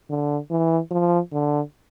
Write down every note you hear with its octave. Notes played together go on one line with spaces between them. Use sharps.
D3
E3
F3
D3